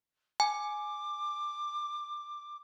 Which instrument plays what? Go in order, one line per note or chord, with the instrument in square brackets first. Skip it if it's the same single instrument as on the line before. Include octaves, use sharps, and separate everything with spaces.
[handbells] G#5 [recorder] D6